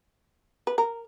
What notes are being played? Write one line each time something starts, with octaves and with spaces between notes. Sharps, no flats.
B4
A#4